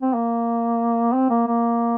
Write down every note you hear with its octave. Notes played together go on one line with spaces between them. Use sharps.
C4
A#3
C4
A#3
A#3